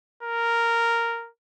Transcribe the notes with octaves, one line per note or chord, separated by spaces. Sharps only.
A#4